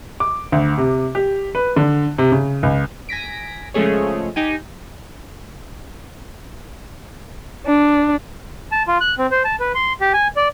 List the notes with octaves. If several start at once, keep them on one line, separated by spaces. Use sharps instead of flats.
D6
D2
C3
G4
B4
D3
C3
C#3
C#2
G#5 A#6 B6 D7
C#3 F3 G#3 A3 G#4 C#5
D#4 G4 G#5
D4
A5
F4
F#6
C4
C5
A5
B4
C6
G4
G#5
D5